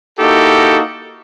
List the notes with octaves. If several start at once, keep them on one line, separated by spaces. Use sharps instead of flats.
A#3 D#4 E4 F#4 G4 A4